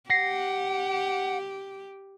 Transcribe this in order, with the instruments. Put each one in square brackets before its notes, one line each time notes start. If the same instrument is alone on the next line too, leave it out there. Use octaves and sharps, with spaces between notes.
[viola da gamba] G4 [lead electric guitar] F#5 [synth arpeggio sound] A#6 C7